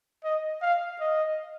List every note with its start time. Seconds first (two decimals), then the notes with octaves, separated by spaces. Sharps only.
0.24 D#5
0.62 F5
1.00 D#5